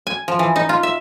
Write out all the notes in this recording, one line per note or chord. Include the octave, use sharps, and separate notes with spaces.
G#5
F3
E3
D#4
F4
E5